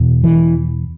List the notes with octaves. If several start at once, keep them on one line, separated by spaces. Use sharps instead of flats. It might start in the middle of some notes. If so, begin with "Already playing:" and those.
Already playing: E2 B2
E3